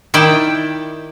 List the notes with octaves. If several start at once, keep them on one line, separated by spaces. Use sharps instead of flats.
D#3 E4 D5 G5